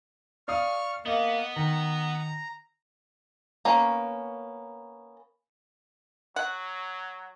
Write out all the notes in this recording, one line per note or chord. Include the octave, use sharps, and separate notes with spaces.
D5 F5 C#6 D#6 F6
A#3 B3 D#5
D#3 A#5
A#3 B3 C#4
F#3 F#5